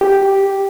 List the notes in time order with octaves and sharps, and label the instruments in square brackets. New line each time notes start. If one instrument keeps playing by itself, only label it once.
[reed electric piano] G4